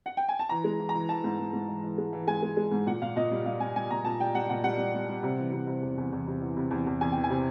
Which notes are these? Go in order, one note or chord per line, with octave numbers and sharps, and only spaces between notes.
F#5
G5
G#5
A5
E3 A#5
G#3
E3
A#5
E3
E3 A5
G#2
G#2
G#2
E3
E3
G#3
E3
G#3 G#5
G#3
G#3
G#2
A#2 F#5
A#2 F5
A#2 D#5
G3 D5
G3 F5
G3 G#5
G3 G#5
A#2 A#5
A#2 A5
G3 G5
G3 F#5
A#2 F#5
G3 F#5
G3
G3
G3
C3
E3
C3
C3
E2
E2
E2
C3
E3
C3
E2
E2
E2 G#5
E3 G5
G#5
C3